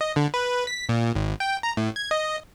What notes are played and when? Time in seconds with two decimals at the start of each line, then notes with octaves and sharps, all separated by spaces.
0.01 D#5
0.16 D3
0.34 B4
0.67 B6
0.89 A#2
1.15 G#1
1.40 G5
1.63 A#5
1.77 A2
1.96 G#6
2.11 D#5